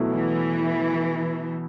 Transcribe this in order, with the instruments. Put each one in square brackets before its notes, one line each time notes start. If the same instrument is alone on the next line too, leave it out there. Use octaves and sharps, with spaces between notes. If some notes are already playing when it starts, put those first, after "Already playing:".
Already playing: [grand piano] B2 F#3 A3 E4
[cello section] E3